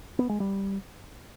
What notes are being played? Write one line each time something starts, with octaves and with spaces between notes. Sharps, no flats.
B3
G#3
G3